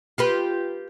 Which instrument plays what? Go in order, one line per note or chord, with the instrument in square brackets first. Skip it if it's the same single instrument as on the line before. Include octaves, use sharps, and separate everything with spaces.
[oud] F4 G4 B4